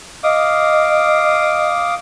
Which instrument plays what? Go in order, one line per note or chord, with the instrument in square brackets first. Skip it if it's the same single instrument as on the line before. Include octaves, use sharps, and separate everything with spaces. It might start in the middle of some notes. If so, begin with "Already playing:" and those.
[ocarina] D#5 [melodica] F5 D6 D#6